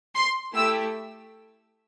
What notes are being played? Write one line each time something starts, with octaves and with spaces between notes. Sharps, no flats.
C6
A3 E4 G4 E6